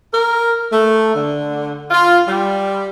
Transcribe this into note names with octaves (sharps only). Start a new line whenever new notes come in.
A#4
A3
D3
F4
G3